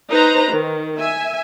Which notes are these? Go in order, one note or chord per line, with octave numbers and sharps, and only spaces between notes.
D#4 B4 C5 A#5
D#3
E5 G#5